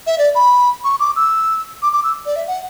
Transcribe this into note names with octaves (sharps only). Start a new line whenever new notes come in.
E5
D5
B5
C#6
D6
E6
D6
D6
E6
D5
E5
F#5